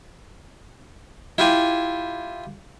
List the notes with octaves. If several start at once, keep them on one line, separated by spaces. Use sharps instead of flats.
E4 F4 G4 G#5